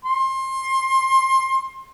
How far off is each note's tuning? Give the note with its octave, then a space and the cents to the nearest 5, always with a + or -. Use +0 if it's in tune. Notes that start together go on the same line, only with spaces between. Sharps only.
C6 +25